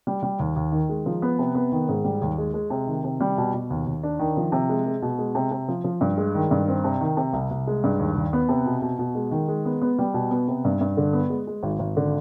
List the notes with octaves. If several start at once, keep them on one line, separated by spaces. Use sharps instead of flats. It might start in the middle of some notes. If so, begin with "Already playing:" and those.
G3
G3
D#2
D#2
D#3
G#3
F3
B3
C3
B3
D#3
G#2
G3
D#2
G#3
G#3
C3
D#3
C3
G3
B2
B2
D#2
D#2
D4
D#3
F3
C3
G#3
G#3
B2
G#3
C3
C3
F3
F3
G2
G#3
D#3
G2
C4
C3
D#3
C3
C2
C2
G#3
G2
D#2
D#2
B3
C3
B2
B2
B2
G#3
D#3
G#3
B3
B3
G3
B2
B3
C3
G2
G2
D3
B3
G#3
G#3
G#1
G#1
D3